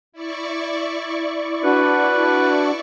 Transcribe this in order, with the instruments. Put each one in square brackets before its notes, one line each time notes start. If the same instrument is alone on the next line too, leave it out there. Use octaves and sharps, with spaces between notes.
[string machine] E4 D5 C#6
[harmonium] D4 F#4 [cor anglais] B4